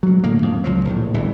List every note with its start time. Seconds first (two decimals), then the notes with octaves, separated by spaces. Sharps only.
0.03 G2 F#3
0.24 A2 D3 A#3
0.42 F2
0.64 C#2 F3 F#3
0.85 A#1 A2
1.14 G1 D2 E3